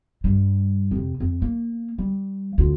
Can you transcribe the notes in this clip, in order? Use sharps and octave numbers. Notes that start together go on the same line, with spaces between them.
G2 G3
F2 C3
F2
A#3
G3
D2 F4